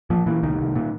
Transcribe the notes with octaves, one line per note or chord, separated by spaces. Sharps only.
A#2 F3
A#2 E3
C2 D#3
C2
A#2